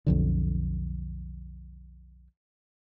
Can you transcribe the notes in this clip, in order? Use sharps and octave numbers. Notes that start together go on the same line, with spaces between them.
B1 F2 D3